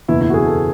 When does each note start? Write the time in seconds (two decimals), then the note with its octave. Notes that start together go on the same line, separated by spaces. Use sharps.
0.08 F#1 E2 B2 E4
0.21 E4
0.30 F#4
0.34 G#4
0.46 A4